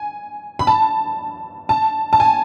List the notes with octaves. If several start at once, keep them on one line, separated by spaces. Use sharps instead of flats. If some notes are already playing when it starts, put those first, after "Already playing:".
Already playing: G#5
B5
A5
A5
A5
G#5